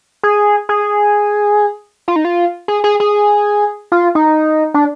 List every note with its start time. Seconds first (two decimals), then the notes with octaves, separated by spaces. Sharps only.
0.23 G#4
0.69 G#4
2.08 F4
2.16 D#4
2.25 F4
2.68 G#4
2.84 G#4
3.00 G#4
3.92 F4
4.15 D#4
4.74 D4